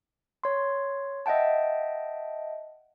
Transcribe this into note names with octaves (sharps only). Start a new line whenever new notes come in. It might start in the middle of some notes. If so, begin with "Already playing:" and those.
C#5 C6
D#5 E5 F#5 G5 A5